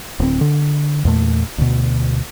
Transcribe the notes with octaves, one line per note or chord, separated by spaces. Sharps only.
D1 C4
D3
E2 A#2 A3
D2 B2